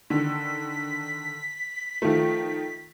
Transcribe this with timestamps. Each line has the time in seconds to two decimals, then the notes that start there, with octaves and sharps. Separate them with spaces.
0.10 D3 D#3 B6
2.02 D#3 F3 A3